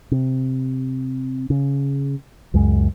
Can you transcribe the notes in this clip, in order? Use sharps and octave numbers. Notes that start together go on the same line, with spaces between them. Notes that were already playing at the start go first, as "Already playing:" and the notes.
C3
C#3
C#2 F#2 G#3